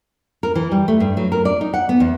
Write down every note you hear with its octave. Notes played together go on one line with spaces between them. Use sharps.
A#4
E3
G3
A3
G2
F#3
A#4
D5
D#4
F#5
B3
E2